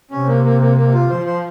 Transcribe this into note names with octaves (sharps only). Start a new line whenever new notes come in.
C3 C#4
A#3
A#3
A#3
A#3
F4
F3 C5
C5